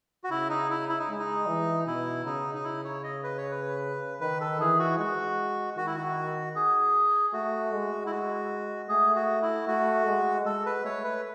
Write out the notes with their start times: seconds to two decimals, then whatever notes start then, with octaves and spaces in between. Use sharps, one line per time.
0.24 F#4
0.30 C#3 E4
0.50 D#4
0.70 E4
0.89 E4
0.99 D#4
1.09 G#3
1.19 D#4
1.47 E3
1.87 B2 E4
2.25 C#3 D#4
2.55 D#4
2.64 E4
2.84 C#5
3.03 D#5
3.23 B4
3.37 C#5
3.51 B4
4.21 D#3 B4
4.41 A4
4.60 E3 G#4
4.79 F#4
4.98 G#3 F#4
5.77 D#3 F#4
5.86 E4
5.95 F#4
6.56 G#4
7.33 A3 F#4
7.72 G#3
8.06 E4
8.12 F#4
8.89 A3 G#4
9.16 F#4
9.42 E4
9.67 A3 F#4
10.06 G#3
10.45 G#3 A4
10.66 B4
10.85 A3 C#5
11.04 B4